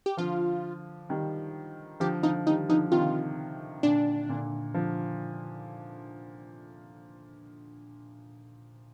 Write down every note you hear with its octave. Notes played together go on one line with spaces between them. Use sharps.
G4
D3 F3 F4
D#3 G3
D3 F3 G4
D3 F3 D#4
D#3 G3 D#4
D3 F3 D#4
C3 D#3 F4
A#2 D3 D4
A#2 D3
D3 F3